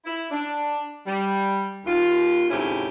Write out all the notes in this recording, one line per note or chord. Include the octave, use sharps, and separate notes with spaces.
E4
D4
G3
D#2 F4
D2 G#2 C3 C#4 E4 G4